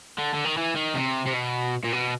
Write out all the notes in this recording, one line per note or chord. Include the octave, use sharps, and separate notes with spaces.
D3
D3
D#3
E3
D#3
C3
C3
B2
A#2
B2